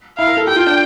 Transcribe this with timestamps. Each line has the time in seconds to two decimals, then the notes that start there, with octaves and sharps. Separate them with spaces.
0.18 E4 F5
0.27 A#4
0.37 A4
0.47 G4 G5
0.56 F4
0.67 D4